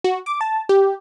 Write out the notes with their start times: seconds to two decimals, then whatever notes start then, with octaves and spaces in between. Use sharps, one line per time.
0.04 F#4
0.26 D6
0.41 A5
0.69 G4